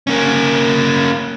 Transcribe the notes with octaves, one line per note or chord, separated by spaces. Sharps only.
A#3 C#4